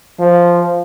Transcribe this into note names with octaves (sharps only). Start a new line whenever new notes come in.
F3